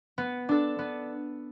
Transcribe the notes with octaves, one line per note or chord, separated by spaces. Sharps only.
B3
D4 A4
B3